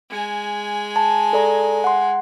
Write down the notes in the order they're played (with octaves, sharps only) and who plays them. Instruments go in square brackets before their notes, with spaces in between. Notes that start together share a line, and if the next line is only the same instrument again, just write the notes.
[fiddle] G#3 G#5
[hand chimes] A5
A4 D5 A#5
F#5 C6